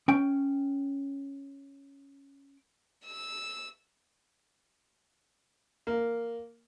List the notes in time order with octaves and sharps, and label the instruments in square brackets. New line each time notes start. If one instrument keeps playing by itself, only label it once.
[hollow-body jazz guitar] C#4 G5
[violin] E6
[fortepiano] A#3